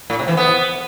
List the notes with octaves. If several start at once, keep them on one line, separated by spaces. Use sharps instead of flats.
A2
C3
E3
B3